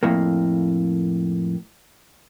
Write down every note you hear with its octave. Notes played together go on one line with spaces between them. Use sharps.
F2 A2 A#3